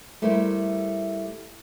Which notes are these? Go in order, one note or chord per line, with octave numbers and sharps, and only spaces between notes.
G3 A3 E4 A#4 C5